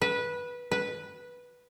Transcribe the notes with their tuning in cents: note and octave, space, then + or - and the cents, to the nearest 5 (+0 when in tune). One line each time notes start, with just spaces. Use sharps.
B4 -15
B4 -10